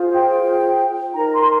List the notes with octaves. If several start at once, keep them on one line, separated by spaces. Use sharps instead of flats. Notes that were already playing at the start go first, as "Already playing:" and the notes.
Already playing: F4 G#4 C5
G5
D#4 A#4 A#5
C6